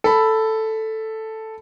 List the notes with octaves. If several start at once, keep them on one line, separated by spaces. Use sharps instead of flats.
A4 B5